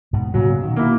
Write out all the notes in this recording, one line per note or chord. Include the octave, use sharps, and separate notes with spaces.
G#2 B2
A#2 C#3 F#3
B2 D#3
A#3 E4